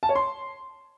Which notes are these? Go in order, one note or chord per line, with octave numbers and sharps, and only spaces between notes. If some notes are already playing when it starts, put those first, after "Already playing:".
A5
C#5
C6